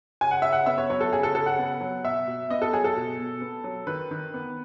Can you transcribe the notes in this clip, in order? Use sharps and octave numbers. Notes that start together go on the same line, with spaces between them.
C#3 G#5
F#5
C#3 E5
F#5
B3 E5
C#5
F#3 C#5
A4
C#3 G#4
A4
C#3 A4
F#5
B3
F#3
B2 E5
B2
B3 D#5
A4
F#3 G#4
A4
B2
B2
B3
F#3
D#3 B4
D#3
B3